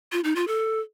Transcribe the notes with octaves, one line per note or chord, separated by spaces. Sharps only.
F4
D#4
F4
A4